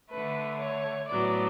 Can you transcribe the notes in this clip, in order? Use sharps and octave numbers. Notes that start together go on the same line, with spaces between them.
D3 A3 B4
C#5
A2 F#3 B3 D5